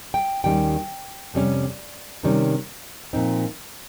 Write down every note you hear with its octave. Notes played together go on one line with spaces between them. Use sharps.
G5
D#2 D#3 G3 C#4 G5
F2 C3 G3 C#4
C3 D#3 G3 C#4
A#2 F3 C4 D#4